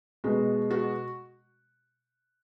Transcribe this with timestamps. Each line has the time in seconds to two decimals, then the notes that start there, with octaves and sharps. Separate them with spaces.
0.24 B2 G#3 F#4
0.70 F#4